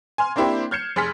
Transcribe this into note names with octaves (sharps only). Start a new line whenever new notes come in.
G#5 C6 F6
A#3 C4 D4 E4 G4 C5
F6 G6 G#6 C7 C#7 E7
F1 G#4 C6 F6 B6